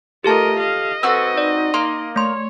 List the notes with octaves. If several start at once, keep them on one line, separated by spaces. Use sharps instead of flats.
A3 F4 G4 A4 A#4 D#5 A5
D#5 F5
C4 F#4 A4 B4 E6
D#4 D5
A#3 C6
A3 C#5 C6